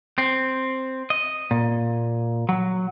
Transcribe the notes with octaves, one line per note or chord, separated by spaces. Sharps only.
C4
D#5
A#2
F#3